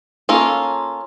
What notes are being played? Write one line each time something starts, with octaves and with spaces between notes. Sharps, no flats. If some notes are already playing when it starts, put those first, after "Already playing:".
A#3 C#4 F4 A4